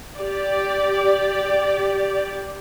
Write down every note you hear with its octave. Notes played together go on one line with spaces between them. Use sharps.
G4 D5